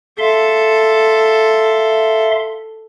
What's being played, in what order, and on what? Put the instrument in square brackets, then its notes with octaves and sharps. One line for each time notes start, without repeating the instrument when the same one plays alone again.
[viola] A4 [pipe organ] E5 F5 C6